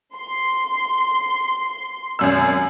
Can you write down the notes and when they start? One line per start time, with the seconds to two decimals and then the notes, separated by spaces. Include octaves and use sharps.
0.16 C6
2.19 G#1 F#2 E6